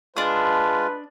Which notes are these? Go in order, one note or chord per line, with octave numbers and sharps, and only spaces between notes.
G#3 D4 F4 B4 D#6